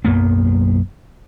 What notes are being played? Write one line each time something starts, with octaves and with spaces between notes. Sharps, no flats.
B1 F#2 A#3 B3